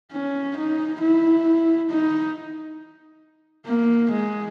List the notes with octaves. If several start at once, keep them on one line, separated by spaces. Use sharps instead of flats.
C#4
D#4
E4
D#4
A#3
G#3